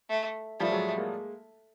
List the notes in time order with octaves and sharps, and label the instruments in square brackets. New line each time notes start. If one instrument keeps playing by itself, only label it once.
[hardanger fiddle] A3
[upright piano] F3 G3 [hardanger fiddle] A3
[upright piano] F#3 G#3
G#3 A#3